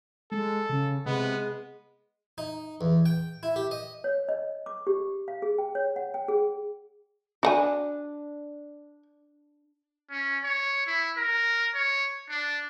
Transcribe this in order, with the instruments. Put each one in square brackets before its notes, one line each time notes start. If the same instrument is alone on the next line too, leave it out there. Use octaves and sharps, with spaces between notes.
[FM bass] G#3 [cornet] A4
[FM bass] C#3
[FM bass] C3 [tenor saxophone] G#3 [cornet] B3
[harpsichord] D#4
E2
G5
E4
G4
D#5
[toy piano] C#5
D#5
D6
G4
F5
G#4
G5
C#5
F#5
G5
G#4
[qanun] D4 [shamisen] F#4 F#5 G#5
[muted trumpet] C#4
C#5
E4
A#4
C#5
D4